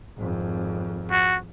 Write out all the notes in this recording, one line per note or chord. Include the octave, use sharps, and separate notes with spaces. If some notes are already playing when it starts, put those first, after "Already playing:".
G#1 F2
F#4